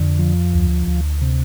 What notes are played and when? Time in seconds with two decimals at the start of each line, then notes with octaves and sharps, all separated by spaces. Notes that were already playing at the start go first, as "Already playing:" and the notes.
Already playing: F2 D3
0.19 F3
0.53 D2
0.87 D2
1.21 C3